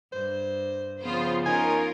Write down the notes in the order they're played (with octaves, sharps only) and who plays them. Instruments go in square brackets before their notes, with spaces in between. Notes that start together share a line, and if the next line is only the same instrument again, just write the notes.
[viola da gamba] G2 [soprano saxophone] C5
[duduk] C#3 [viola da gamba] F3 B3 [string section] F4 C5
[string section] C#4 F4 A#4 [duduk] D#4 [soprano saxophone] G#5